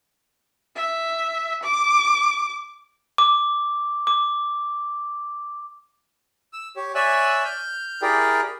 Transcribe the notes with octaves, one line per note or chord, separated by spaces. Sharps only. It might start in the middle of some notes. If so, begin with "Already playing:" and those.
E5
D6
D6
D6
E6
G4 C#5
C#5 D5 E5 G#5 E6 F#6
F6 G6
E4 G4 G#4 A#4 D5 G5